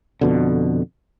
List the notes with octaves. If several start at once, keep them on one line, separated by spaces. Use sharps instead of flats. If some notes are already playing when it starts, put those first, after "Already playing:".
F2 B2 D3